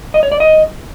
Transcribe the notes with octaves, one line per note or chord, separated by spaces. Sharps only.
D#5
C#5
D5
D#5